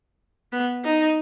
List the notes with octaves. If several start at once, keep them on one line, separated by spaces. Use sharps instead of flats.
B3
D#4